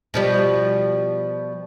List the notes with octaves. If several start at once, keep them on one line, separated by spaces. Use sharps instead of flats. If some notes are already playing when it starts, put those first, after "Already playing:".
B2 F3 G3